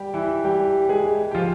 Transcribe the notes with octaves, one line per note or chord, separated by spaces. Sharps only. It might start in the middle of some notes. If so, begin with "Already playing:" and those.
Already playing: G3 G4
E3 E4
G3 G4
G#3 G#4
G4
F3 F4